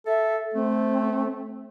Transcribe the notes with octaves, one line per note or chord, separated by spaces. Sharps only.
A4 E5
A3 C4